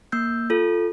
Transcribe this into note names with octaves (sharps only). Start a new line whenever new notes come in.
A#3 E6 G6
F4 A4